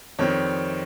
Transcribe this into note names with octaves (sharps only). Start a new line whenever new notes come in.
F2 D#3 G3 C4 C#5